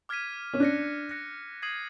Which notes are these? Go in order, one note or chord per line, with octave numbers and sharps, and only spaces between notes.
D6 F6 G#6 B6 D#7
C#4
D4 F#6 A#6 C#7
F#6 A#6 C#7
D#6 G#6 C7 D#7 F#7